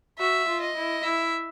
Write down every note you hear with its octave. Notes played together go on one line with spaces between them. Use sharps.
F#4 E5
F4
D#5
E4
E4 E5